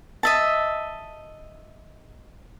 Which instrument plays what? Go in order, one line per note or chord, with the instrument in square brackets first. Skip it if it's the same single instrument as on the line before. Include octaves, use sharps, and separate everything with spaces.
[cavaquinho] D#5 E5 A5